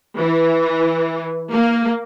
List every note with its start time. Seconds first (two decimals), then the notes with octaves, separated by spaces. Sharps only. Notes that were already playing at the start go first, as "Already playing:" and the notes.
0.19 E3
1.53 A#3